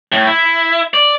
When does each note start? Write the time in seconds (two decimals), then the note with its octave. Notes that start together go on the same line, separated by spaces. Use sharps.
0.12 A2
0.27 E4
0.94 D5